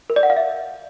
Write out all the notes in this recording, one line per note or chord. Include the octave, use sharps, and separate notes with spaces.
A#4
D5
F#5
F5
E5